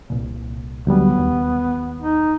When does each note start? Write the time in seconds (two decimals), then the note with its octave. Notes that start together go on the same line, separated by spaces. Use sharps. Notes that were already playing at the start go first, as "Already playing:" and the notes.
0.10 C2 A#2
0.87 D2 F#3 G3 B3
1.19 D#2
2.01 D#4